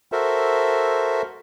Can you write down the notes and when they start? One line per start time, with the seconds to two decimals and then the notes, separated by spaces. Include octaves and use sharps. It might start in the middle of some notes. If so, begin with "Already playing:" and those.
0.12 F#4 A4 A#4 C5 E5